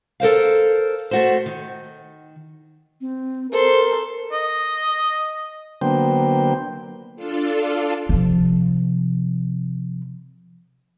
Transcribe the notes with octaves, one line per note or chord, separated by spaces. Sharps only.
A4 A#4 C5 F5
A3 F#4 C5
D#3
C4
A4 A#4 C5 C6
D#5
D3 F#3 A#3 B3 C5 G5
D4 F4 A4
C3 F3